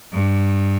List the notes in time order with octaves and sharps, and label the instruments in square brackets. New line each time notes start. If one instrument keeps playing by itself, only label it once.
[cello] G2